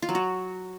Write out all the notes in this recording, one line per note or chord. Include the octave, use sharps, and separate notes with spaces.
F4
F#3
F#4